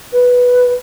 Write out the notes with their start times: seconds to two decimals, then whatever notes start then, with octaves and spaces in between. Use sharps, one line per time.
0.13 B4